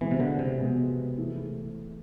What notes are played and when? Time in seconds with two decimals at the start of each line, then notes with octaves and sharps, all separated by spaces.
0.01 B2 E3 G#3 B3
0.11 C3
0.20 D3
0.39 C3
0.59 B2 G#3 B3
1.17 E3 A3 E4 G#4